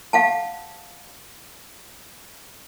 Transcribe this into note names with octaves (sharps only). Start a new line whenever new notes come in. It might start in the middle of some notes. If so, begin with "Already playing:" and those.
F5 F#5 A5